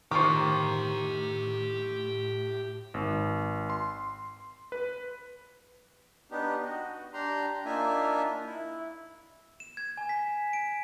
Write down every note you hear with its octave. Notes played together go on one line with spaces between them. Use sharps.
A2 D#3 F4 G4 C5 A#5 C#6 D6
G#1
C6
B4
B3 D4 D#4 G4
F#4 D#5
D4 G4 A#5 C6
A#3 D4 D#4 F4 E5 G#5
E4
E7
G#6
G#5
B6
D7